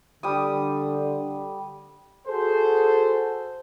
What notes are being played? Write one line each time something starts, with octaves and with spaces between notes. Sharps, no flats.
D3 G3 D#6
F#4 G#4 A4 C5